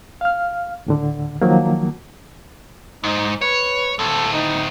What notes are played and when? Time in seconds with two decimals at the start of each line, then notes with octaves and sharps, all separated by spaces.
0.21 F5 F6
0.86 D2 A2 D3
1.42 D#3 F3 F#3 A#3
3.04 G#2 D#4
3.41 B4 C#5
3.99 D2 A2 A4
4.33 D#4